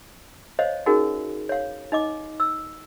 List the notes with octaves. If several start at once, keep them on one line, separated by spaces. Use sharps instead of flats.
C5 C#5 D#5 F5
C#4 D#4 F#4 G#4 A#4
C#5 F5
D#4 D#5 D6
E6